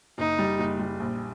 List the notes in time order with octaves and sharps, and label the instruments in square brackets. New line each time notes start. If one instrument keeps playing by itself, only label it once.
[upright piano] F#1 [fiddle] D#4
[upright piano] G3
F#1
G3
A#1